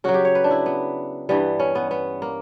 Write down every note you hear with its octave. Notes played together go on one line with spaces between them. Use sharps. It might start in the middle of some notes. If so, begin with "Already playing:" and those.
C#3 F#3 F#4
G4
C#5
B4
D4
E4
B3
G2 E3 G3 B3
C#4
B3
B3
A#3